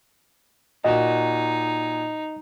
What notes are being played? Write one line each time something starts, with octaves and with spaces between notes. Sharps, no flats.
A#2 D#4 F#4 D#5